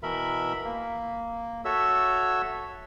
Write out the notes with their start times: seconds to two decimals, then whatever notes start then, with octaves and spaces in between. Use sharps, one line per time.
0.03 B2 E3 A#4 E5 B5
0.65 A#3
1.65 F#4 A4 C#5 E5 E6